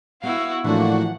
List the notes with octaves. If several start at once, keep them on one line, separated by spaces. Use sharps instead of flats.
B3 E4 F#4 F5
A2 E3 F3 A#3 D4 F#4 F#5